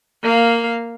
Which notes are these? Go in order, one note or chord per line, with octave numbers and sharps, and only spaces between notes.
A#3 F5